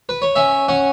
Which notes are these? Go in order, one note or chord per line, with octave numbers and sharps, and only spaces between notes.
B4
C#5
C#4 E5
C#4 F#5